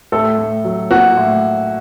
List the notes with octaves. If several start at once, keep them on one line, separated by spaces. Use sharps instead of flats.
A2 A4
A2
F#3
A#3 F#4
A2